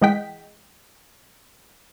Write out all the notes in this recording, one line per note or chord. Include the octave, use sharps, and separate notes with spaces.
E3 G#3 D#5 F#5 G5 B6